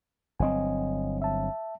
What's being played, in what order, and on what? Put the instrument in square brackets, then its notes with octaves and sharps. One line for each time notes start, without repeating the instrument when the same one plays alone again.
[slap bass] G1 F#3 C4 [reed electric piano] D#5 G#5
[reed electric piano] E5 A5